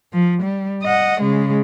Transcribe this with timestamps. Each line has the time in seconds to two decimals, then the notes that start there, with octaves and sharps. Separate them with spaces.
0.13 F3
0.42 G3
0.83 D#5 F#5
1.21 C#3 G#3